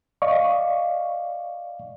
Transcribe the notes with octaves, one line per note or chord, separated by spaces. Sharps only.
D5 D#5 F5 C#6